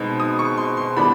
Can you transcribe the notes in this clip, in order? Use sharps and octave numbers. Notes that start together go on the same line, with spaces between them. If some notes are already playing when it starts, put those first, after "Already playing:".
Already playing: B2 G#3 C4 D#4
D#6
C#6
C6
C6
A2 E3 G3 B3 D4 B5